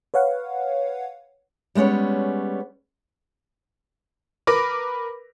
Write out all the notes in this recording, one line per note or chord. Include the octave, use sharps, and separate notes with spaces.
B4 C#5 F5 F#5
G3 G#3 B3 C#4 C#5
A#4 B4 B5 D6 A#6